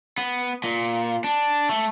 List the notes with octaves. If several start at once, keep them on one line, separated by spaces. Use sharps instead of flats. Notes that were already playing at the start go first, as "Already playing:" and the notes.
B3
A#2
D4
A3